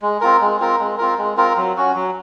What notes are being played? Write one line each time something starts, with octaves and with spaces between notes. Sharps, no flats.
G#3
C4 F4 A#4
G#3
C4 F4 A#4
G#3
C4 F4 A#4
G#3
C4 F4 A#4
F#3
C#4 F#4
F#3